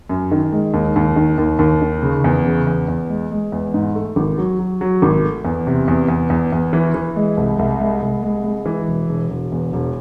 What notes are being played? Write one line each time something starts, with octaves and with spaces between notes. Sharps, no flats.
F#2
D#3
G#3
D#2
D#2
D#3
D#2
D#2
D#3
C#3
E2
C#3
E2
E2
G#3
G#3
E2
G#2
A3
G#1
F#3
F#3
F#3
G#1
A3
E2
C3
E2
E2
E2
E2
E3
E3
G#3
C2
C2
G#3
C2
G#3
G#3
E3
E1
E1
E1
E2
E1